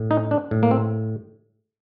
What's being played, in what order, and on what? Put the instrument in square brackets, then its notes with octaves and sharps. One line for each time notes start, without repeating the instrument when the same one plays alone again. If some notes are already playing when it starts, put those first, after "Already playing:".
Already playing: [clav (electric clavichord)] A2
D#4
D4
A2
A#3
C4